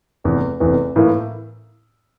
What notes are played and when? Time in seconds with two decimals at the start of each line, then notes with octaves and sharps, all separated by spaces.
0.24 F1 E2 E3
0.60 F1 E2 E3
0.96 A2 E3 A#3 E4